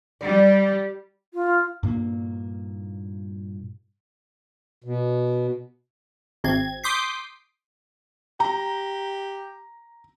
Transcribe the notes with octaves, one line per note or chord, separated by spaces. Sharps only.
G3 D5
F4
G2 A#2 A#3
B2
G#1 C4 G#6
C6 D6 D#6 G6 B6 C7
G4 A#5